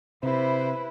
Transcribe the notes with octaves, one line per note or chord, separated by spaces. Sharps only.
C3 E4 B4 C5